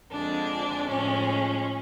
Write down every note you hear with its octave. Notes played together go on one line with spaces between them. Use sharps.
F2 D3 F3 G#3 D4
A2 F3 G#3 C#4